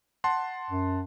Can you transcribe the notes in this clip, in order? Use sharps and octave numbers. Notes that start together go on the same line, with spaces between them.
F#5 A5 C6
F#2